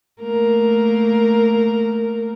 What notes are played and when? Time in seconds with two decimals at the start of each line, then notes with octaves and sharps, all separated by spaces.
0.22 A3 A#3 A#4